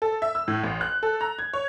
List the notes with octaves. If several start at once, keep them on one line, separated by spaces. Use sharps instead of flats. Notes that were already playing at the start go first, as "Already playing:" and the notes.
A4
E5
E6
A2
A1
F#6
A4
A#5
G#6
C#5